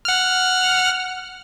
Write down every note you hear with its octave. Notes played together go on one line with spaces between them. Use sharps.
F#5 F6